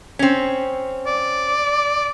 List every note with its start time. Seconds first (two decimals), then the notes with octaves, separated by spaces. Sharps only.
0.19 C4 C#4
1.06 D5